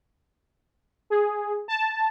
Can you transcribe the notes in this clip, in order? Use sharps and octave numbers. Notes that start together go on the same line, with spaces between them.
G#4
A5